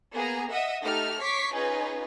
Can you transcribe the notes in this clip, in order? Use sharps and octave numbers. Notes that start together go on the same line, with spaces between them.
A#3 B3 G#4 A#5
D#5 E5 F#5 D#6
A3 D#4 G4 A4 F6
C#5 C#6 D6 B6 C7
C#4 D#4 F4 G#4 B4